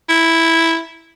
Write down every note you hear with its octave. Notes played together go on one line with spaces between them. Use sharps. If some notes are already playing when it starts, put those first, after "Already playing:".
E4